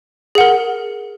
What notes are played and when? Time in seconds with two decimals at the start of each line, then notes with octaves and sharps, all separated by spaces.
0.35 G#4
0.38 F#5
0.41 A#4